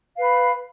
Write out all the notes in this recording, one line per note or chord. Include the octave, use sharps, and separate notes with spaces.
B4 F5 B5